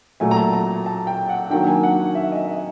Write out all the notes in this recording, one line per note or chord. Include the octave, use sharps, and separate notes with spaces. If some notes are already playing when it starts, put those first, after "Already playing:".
A#2 F#3 A3 G#5
A#5
A5
A#5
A5
G5
F#5
D#3 F#3 A#3 D4 G5
G#5
F#5
E5
D#5
E5